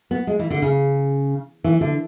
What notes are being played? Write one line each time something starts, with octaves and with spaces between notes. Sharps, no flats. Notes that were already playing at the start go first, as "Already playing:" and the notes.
B3
G#3
E3
D3
C#3
E3
D3